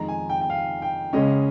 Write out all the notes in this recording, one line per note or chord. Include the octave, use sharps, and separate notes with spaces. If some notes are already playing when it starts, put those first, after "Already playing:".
Already playing: F2 D#3 G#3 D#4 A#5
G#5
G5
G5
F5
G5
C#2 C#3 G#3 C#4 D#5